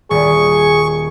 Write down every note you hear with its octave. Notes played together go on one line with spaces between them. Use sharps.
D#1 G#4 C#6